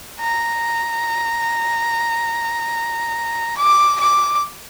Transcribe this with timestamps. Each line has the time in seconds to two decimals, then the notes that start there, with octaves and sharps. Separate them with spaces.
0.20 A#5
3.57 D6
4.00 D6